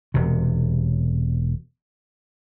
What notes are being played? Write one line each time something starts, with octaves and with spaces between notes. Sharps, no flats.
E1 C3